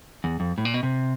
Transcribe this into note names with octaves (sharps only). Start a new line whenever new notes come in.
E2
F2
A2
A#2
B2
C3